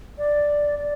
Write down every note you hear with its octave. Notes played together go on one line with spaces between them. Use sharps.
D5
D5